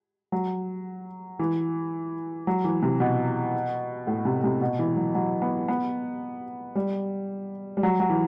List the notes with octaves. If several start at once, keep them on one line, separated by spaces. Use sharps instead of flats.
F#3
E3
F#3
E3
C3
B2
A2
C3
C3
B2
E3
F#3
F#3
B3
B3
G3
G3
F#3
F#3
E3